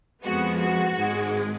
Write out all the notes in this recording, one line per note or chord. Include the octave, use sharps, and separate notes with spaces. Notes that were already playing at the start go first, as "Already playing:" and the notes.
F2 F3 G#3 B3 F#4
F#4
G#1 G#2 G#3